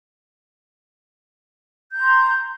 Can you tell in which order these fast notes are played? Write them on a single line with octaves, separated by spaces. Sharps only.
G6 A#5 C6